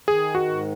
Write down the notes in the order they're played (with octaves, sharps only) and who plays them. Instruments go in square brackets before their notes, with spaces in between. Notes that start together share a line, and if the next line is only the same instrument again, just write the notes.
[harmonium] D#3 [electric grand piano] G#4
[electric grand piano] F#4
[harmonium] G#2